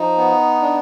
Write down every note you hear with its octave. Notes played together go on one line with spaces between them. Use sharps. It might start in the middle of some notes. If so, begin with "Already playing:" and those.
Already playing: F3 D#4
B3
D4